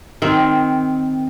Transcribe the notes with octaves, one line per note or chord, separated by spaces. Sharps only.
D#3 C4